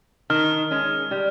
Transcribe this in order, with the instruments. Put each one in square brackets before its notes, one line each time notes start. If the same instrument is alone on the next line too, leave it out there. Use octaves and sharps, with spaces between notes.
[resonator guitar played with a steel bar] D#3 [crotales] F6
[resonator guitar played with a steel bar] G#3 C#4
G3